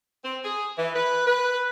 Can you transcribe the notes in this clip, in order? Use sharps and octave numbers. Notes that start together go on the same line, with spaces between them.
C4
G#4
E3
B4
B4